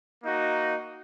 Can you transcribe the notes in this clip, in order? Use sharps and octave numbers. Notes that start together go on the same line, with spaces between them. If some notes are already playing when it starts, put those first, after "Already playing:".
A#3 D#4 F#4